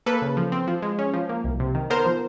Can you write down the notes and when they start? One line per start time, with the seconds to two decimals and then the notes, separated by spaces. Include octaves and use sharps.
0.06 A#3 A4 B4
0.22 C#3
0.37 F3
0.52 C4
0.68 F3
0.82 G#3
0.99 C#4
1.14 F3
1.29 A#3
1.44 C2
1.60 C3
1.75 D#3
1.90 B3 A#4 C5
2.06 F3